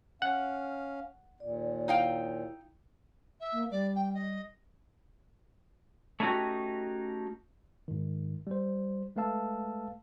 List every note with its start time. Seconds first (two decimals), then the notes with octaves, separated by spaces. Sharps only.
0.22 C#4 F5 F#5
1.40 D#2 A#2 D5
1.88 D#4 E4 F5 G5
3.40 E5
3.53 A#3
3.71 G3 D5
3.95 G5
4.14 D#5
6.20 A3 C#4 D#4 E4 F#4 G4
7.88 G#2 D#3
8.47 G3 C5
9.16 G#3 A3 B4 F5 A5 E6